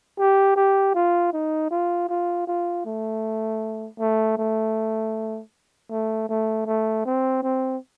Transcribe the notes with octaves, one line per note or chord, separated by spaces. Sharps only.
G4
G4
F4
D#4
F4
F4
F4
A3
A3
A3
A3
A3
A3
C4
C4